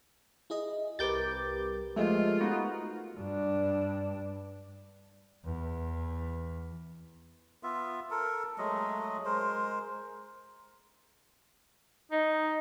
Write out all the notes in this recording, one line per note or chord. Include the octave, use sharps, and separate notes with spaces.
E4 G#4 D#5
C2 G4 A#4 B4 D6 G6 A6
F3 G#3 A3 F4
B3 D#4 F#4
G2 D4
E2
B3 F4 E5
A4 A#4
F#3 G#3 A3 D#5
G#3 A#4 C5
D#4